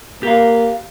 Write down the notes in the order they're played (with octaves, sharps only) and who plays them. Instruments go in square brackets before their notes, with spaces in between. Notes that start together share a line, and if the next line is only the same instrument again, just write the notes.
[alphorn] A#3 [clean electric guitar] G4 F5